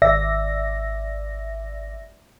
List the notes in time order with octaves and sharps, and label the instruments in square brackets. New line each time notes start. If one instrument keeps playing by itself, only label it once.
[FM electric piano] G#1 D5 E5 A#6